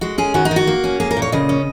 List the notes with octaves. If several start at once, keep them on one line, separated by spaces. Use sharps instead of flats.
G#3 F#4
C#4 G#4
D#3 F#4
D#4
D#3
F#4
A#3
C#4
A#3 G#4
A#4
A#2
C#5
C#3 D#5
C#4